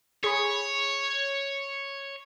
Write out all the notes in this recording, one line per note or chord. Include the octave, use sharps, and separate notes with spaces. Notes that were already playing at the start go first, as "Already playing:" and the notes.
G#4 C#5 B5